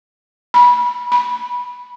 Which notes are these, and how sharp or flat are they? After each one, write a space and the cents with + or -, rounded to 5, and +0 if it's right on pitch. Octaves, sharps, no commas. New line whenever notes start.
B5 -20
B5 -10